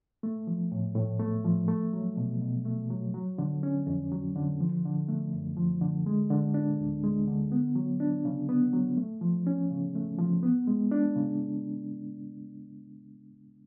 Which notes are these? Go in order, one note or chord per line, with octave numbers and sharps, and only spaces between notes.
A3
F3
A2
A2
A3
F3
A3
F#3
B2
B2
A3
F#3
F#3
D3
C#4
F2
F#3
D3
F3
D3
A3
F#2
F3
D3
G#3
D3
D4
D2
G#3
D3
B3
F#3
D4
C#3
B3
F#3
A3
F3
C#4
C#3
A3
F3
B3
G#3
D4
C#3